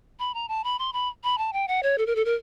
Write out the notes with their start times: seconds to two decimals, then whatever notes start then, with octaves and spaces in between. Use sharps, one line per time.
0.19 B5
0.34 A#5
0.48 A5
0.64 B5
0.79 C6
0.93 B5
1.24 B5
1.38 A5
1.53 G5
1.68 F#5
1.83 C#5
1.98 A4
2.06 A#4
2.15 A4
2.25 A#4